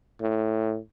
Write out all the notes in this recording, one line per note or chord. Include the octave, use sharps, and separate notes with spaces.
A2